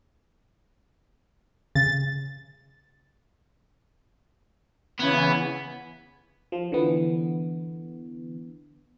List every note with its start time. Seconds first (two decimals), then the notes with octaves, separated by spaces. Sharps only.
1.75 C#3 A6
5.00 C#3 E3 B3 G#6
6.52 F3
6.72 D3 E3 B3